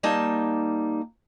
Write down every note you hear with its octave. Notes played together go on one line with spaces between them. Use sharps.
G3 A#3 D#4 A5